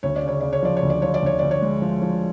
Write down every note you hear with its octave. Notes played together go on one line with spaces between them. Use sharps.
D2 C#5
D5
C#3 C#5
C#3 D5
C#5
F3 D5
C#5
D2
D5
F3 C#5
D5
D2 C#5
D2 D5
C#5
G#3
F3
F3